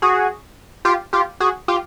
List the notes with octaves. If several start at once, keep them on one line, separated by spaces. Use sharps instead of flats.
F#4 G#4
F4 G4
F4 G4
F#4 G#4
F4 G4